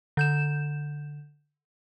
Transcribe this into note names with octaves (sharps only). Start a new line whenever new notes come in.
D3 G6 E7